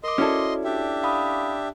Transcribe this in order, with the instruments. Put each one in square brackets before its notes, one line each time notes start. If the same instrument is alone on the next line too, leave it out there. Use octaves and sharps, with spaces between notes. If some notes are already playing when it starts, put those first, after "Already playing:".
[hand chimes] A#4 D6 [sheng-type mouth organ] D#5 C6
[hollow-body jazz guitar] C#4 E4 A4 [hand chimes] F#4 D5
[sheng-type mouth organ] D4 G4 E5
[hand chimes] F5 B5 D#6